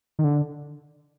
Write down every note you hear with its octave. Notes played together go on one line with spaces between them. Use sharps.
D#3
D3